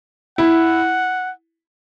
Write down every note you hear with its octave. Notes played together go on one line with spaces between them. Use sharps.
E4 F#5